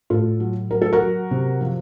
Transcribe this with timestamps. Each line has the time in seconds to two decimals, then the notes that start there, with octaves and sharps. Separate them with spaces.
0.10 A2 F4 A4
0.40 F#3
0.71 F#3 A#4
0.82 A4
0.93 F#4 A#4
1.01 F#3
1.31 C3
1.61 F3